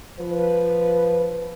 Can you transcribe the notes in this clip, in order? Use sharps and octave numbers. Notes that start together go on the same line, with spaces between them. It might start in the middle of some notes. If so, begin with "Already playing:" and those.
F3 B4